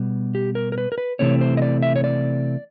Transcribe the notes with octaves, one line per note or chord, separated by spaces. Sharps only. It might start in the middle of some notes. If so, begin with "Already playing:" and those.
Already playing: B2 G3 B3
G4
A#4
A#4
B4
A#4
B4
C3 E3 A3 C4 C#5
C5
D#5
D5
E5
C#5
D5